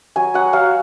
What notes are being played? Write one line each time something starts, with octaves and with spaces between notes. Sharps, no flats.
F#3 G#5
F#3 F#5
F#3 F5